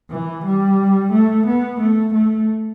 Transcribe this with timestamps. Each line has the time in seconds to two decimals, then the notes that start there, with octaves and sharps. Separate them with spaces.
0.10 E3
0.44 G3
1.12 A3
1.47 B3
1.80 A3
2.14 A3